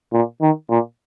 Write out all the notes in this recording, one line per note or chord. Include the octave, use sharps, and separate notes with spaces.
A#2
D#3
A#2